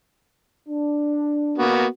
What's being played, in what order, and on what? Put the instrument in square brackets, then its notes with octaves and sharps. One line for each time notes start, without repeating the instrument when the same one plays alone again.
[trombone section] D4
[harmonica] A#3 B3 F#4